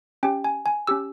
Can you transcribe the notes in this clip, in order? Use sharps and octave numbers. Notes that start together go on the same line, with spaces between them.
C#4 G4 G5
G#5
G#5
C#4 G4 E6